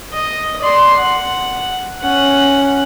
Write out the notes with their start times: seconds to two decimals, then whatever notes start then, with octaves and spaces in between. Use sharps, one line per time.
0.12 D#5
0.61 D5 C6
0.97 F#5
2.02 C#4 F#5